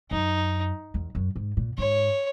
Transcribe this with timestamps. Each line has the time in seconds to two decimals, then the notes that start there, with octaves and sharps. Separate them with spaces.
0.11 F#2 D#4
0.94 E2
1.15 F#2
1.36 G#2
1.57 A#2
1.78 G#2 C#5